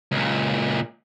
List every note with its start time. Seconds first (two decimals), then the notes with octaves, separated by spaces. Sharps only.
0.12 C#2 A#2